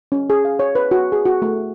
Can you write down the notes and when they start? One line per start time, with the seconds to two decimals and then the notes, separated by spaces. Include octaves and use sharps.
0.12 C#4
0.30 G#4
0.45 F5
0.59 C#5
0.75 B4
0.91 F#4
1.12 G#4
1.25 F#4
1.42 A3